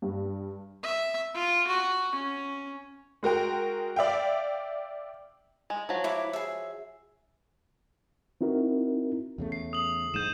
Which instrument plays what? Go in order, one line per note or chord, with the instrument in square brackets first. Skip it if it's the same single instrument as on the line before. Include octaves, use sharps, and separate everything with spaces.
[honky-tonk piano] G2
[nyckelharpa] E5
F4
F#4
C#4
[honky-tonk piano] G#3 F#4 A#4 G5
D5 E5 F5 G5
[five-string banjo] G#3
F3 F#3
[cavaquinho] E4 B5 D6
G#4 E5
[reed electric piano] C4 D#4 E4 F#4 A#4
[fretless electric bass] E2 C#3 A3
[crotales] C7
D#6 F#7
[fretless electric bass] A#1 G#2 [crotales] G6 D#7 E7